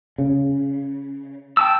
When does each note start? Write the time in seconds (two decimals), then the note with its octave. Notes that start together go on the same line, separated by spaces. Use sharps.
0.18 C#3
1.57 G5 A5 E6